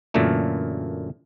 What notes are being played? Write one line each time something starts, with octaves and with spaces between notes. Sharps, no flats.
F#2 A#2 D3 E3 A3 A#3